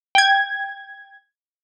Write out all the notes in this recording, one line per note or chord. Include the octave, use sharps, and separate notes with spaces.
G5 G#6